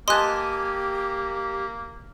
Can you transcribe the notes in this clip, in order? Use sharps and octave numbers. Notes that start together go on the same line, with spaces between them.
A#3 G4 D#5 G#5 A5 C6 F#6